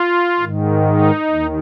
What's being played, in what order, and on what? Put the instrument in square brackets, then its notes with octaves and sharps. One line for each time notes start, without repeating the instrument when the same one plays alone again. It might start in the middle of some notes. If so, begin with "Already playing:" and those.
Already playing: [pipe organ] F4
G#2 D#3
D#4
D#2 D#3